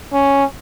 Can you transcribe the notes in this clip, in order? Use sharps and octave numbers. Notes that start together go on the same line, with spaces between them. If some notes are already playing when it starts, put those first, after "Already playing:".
C#4